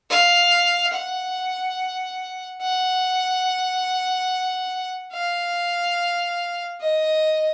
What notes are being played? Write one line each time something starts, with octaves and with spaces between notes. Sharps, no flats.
F5
F#5
F#5
F5
D#5